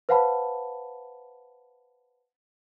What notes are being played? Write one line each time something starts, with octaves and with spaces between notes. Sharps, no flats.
B4 C5 F5 F#5 A5 B5